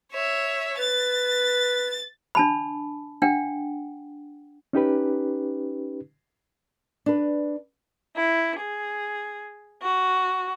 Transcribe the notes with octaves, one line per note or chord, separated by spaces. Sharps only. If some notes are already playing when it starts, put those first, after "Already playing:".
C#5 E5
B4 A6
D4 A5 B5
D4 F#5 G5
C#4 D#4 G4 B4
D4 B4
E4
G#4
F#4